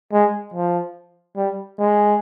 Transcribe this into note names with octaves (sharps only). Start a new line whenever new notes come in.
G#3
F3
G3
G#3